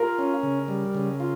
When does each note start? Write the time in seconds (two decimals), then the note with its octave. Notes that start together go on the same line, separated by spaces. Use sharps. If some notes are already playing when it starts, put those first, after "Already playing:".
Already playing: F4 A#4
0.19 C#4
0.43 C#3
0.68 G3
0.94 C#3
1.20 F4